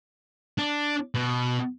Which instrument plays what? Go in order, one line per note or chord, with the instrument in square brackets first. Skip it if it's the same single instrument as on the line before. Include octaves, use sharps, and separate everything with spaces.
[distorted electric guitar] D4
B2